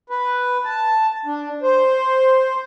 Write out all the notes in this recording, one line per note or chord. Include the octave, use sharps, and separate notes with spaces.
B4
A5
D4
C5